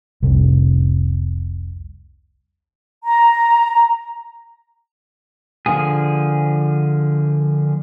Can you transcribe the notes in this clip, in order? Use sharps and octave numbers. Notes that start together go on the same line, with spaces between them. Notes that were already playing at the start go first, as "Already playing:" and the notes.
F1 C2
A#5
D3 F3 A#3 G#4